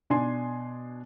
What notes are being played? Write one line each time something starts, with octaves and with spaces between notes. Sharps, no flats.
B2 D4 G#5 C6